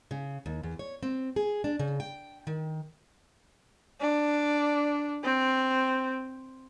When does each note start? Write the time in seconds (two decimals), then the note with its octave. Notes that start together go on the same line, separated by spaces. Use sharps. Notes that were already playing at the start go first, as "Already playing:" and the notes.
0.11 C#3
0.46 D#2
0.63 E2
0.79 C#5
1.03 C4
1.36 G#4
1.64 D4
1.79 C#3
2.00 G5
2.47 D#3
4.00 D4
5.24 C4